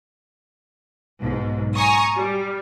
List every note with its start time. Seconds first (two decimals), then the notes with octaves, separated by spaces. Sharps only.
1.22 B1 G#2
1.75 G#5 A#5 C#6 D#6
2.16 G3